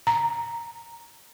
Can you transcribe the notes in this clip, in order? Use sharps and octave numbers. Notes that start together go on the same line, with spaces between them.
A#5